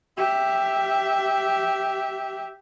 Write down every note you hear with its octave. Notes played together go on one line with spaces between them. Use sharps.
G4 E5